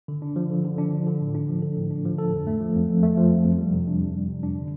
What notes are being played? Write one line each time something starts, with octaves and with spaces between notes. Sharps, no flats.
D3
D4
F3
D3
D3
D4
F3
D3
A2
D4
F3
A4
A2
D4
F3
A4
F2
A3
F3
F2
F2
A3
F3
F2
F2
G3
C3
D4
F2
G3
C3
D4
D3